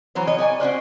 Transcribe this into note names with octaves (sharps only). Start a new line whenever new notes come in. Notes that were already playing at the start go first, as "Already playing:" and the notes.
E3 F#3 C5 C#5
C#5 D#5
C#5 D5 G#5
C#4 F#4 C5 D5